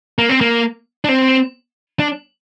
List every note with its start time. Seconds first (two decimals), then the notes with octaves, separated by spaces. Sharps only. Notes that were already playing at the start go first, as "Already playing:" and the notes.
0.18 A#3
0.29 C4
0.41 A#3
1.04 D4
1.09 C4
2.00 D4